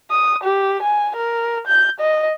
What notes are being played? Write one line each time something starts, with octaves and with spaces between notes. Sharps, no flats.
D#6
G4
G#5
A#4
G6
D#5